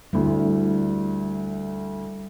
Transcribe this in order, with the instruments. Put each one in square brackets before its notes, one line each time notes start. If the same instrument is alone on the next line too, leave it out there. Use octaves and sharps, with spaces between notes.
[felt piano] D2 E4 [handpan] G3